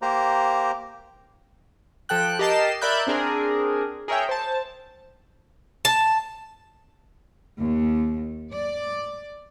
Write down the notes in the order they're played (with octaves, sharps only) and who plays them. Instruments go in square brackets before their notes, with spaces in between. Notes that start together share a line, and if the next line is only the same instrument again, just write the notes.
[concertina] A#3 G4 C5 A#5
[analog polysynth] F3 A4 G5 F#6
G4 A#4 D#5 A5 C7 E7
A#4 D5 E5 B5 F#6 G6
C4 D4 G#4 A#4
G#4 A#4 C#5 E5 G5
C5 A5
[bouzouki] A5
[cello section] D#2
D5